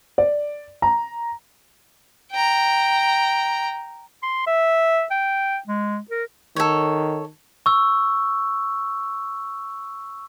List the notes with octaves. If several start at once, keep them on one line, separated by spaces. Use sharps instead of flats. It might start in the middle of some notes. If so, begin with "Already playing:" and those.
D5
A#5
G5 A#5
C6
E5
G5
G#3
A#4
D#3 A4 C#5
C#6 E6